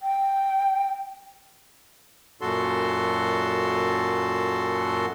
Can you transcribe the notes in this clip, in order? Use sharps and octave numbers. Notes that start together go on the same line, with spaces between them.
G5
F#2 A#2 F#4 A4 C6